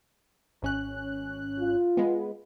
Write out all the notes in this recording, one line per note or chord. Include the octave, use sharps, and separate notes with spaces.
G#1 C#4 F#6
F4
G#3 B3